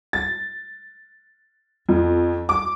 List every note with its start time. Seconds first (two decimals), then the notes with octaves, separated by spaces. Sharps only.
0.13 A6
1.89 F2
2.49 D6